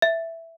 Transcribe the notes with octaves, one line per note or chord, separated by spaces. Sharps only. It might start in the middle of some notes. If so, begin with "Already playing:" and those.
E5